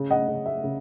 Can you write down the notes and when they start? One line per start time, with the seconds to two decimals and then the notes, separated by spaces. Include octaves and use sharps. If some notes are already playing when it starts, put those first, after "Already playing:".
Already playing: C#3
0.10 D#5 F#5
0.28 C#3
0.46 E5
0.64 C#3